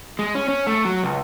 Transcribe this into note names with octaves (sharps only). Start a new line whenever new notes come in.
G#3
C#4
C#4
A3
F#3
C#2